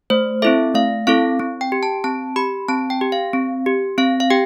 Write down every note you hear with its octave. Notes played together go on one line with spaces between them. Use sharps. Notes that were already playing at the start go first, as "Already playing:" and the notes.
A3 C5
C4 E4 A4 E5
A3 F5
C4 E4 A4 F5
C4
G5
G4
A5
C4 A5
G4 B5
C4 A5
G5
G4
F5
C4
G4
C4 F5
F5
G4 G5